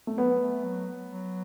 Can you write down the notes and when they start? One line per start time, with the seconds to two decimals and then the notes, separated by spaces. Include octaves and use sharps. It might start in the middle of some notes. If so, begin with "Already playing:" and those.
0.07 A3
0.17 F#3 B3
0.40 A3
0.64 F#3
1.10 F#3